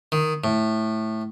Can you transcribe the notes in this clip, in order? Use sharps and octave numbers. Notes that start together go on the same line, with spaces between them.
D#3
A2